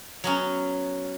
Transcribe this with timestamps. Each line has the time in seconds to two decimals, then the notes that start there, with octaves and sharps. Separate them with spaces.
0.24 F#3 B3 C#4